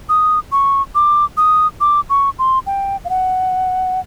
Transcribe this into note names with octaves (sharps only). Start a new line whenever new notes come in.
D#6
C#6
D6
D#6
D6
C#6
C6
G5
F5
F#5